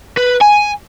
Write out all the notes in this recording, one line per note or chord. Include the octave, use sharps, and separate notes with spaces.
B4
G#5